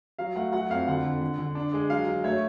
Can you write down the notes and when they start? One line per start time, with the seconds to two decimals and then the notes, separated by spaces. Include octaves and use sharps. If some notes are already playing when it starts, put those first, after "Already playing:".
0.19 F#3 F5
0.35 A3 F#5
0.53 F#3 F#5
0.70 F2 F5
0.87 D3 F#5
1.04 D3
1.21 D3
1.38 D3
1.55 D4
1.73 G#3
1.90 F#3 F5
2.07 F#3
2.24 A3 C#5